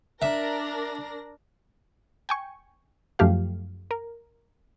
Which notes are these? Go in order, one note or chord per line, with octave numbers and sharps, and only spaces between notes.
D4 A#4 E5 A#6
G5 G#5 C#6
F#2 F3 A3 G4 F5
A#4